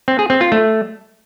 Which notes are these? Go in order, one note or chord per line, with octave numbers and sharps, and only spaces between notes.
C4
G#4
C4
F4
A3